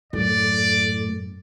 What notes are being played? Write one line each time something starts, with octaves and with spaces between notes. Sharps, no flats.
F#2 A2 D5